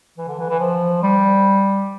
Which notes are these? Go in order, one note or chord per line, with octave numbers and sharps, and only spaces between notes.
E3
D3
E3
E3
F3
G3